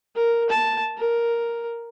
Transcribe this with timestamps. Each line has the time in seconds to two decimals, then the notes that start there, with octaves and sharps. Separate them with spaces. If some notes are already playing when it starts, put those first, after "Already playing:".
0.16 A#4
0.50 A5
0.97 A#4